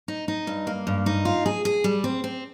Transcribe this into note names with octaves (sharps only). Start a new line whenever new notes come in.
D#4
D#4
G2
A#3
G2
D#4
F4
G#4
G#4
G3
C4
C4